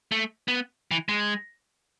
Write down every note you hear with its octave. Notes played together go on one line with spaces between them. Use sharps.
A3
B3
E3
G#3